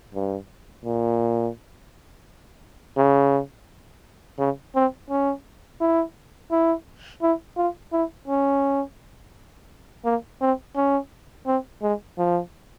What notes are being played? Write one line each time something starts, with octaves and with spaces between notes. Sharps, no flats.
G2
A#2
C#3
C#3
C4
C#4
E4
E4
E4
F4
E4
C#4
A#3
C4
C#4
C4
G#3
F3